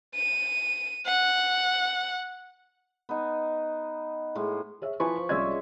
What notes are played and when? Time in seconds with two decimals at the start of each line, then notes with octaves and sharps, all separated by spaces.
0.15 D#7
1.06 F#5
3.09 B3 D#4
4.35 A2 G#3
4.82 G#4 C#5 E5
5.00 F3 E4 B4 G#5 B5 C#6
5.16 C5
5.29 C2 G#3 C#4 D5 E5 G#6